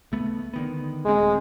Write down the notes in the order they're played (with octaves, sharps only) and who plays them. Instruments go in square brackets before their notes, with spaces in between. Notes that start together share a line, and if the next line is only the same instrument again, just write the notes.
[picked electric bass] C#2 A3 B3
D3 D#3 B3
[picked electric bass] D#1 D2 C4 [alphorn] G#3